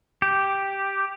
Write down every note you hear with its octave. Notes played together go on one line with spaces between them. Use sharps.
G4